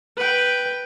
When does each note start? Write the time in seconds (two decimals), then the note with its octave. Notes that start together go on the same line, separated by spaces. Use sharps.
0.16 B4 G5